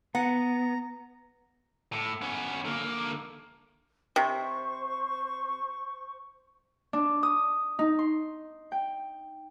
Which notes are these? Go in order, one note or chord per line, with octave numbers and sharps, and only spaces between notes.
B3 F#5 A#5
A2
B3 C#4
D3 A#3
C3 C5 C#6
D4
D#6
D#4
C6
G5